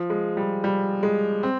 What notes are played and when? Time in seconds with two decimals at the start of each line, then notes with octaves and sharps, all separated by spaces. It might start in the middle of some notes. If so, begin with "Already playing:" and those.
Already playing: F3
0.10 G#3
0.37 G3
0.64 G3
1.03 G#3
1.43 C4